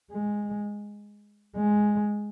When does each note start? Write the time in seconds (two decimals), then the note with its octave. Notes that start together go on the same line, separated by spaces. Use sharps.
0.11 G#3
1.56 G#3